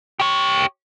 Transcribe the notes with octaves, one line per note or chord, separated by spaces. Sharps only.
G4 C#5